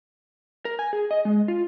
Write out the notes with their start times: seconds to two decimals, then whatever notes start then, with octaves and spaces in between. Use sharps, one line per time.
0.65 A#4
0.79 G#5
0.93 G#4
1.11 D#5
1.25 G#3
1.48 F4